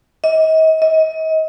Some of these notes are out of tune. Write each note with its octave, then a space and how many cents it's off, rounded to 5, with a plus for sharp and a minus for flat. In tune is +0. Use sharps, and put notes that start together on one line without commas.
D#5 +35
D#5 +30